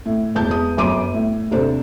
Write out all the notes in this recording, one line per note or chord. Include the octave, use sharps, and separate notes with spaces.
A2
E1 E2 A5 G6
E2 D#6
G1 F#2 C6 D6 D#7
A2
D#2 C3 D4 A4 C5